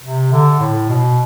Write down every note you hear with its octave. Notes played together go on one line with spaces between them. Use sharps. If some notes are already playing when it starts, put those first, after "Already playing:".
C3
D3
A2
B2